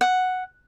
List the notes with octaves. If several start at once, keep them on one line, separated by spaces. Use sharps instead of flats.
F#5